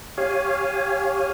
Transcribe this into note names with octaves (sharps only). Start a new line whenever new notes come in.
G4 C#5 F5 G#5